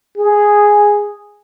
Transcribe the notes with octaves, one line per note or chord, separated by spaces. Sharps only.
G#4